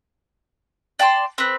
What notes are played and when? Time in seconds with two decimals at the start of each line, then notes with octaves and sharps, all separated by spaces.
0.99 D5 G5 A5 C6
1.38 C4 B4